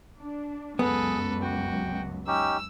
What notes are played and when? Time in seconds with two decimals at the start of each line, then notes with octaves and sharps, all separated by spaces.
0.18 D4
0.79 C#2 F#2 B3 G#4 A4 B4
1.42 F#4 G5
2.27 C#4 D#4 G4 E6